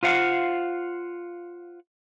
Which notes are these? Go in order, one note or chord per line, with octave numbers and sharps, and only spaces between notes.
F4 C5 F5 F#5